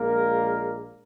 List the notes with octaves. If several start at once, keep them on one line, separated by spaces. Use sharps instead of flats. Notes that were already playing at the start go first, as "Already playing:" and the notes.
Already playing: A#1 A#2 G#3 A#3 A#4